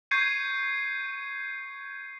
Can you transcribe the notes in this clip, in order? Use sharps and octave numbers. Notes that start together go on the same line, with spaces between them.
C#6 G6 G#6 C7 C#7 D#7